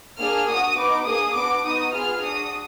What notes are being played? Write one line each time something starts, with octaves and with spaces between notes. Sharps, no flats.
A#3 D4 G#4 F6
D4 F#4 D#6
B3 D#4 F#4 D6
A#3 D4 G#4 D#6
B3 D4 F#4 D6
B3 D#4 F#4 D#6
B3 F4 G#4 F6
D4 F#4 D#6